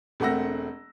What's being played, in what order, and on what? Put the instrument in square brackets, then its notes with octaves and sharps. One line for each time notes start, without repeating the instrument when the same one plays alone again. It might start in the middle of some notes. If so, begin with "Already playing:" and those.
[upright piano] E1 A3 C4 F#5 E6 A#6